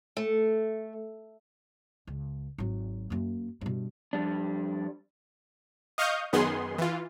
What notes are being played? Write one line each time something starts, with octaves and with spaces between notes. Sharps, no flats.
A3
C#2
G#1 F#3
F#2 A#3
G2 B2
F2 G3 D4
D#5 F5 C#6 D#6 F6 G6
F#2 D#3 B3 G#4 C6
E3 F4